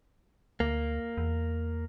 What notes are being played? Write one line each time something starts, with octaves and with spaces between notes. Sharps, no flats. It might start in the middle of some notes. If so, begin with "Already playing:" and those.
D2 A#3
E2